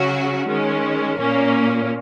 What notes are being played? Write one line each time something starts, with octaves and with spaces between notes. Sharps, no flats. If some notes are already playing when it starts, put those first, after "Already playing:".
Already playing: C#3 F#3 C#4 F#4
D#3 G#3 C#4
A#2 A#3 C#4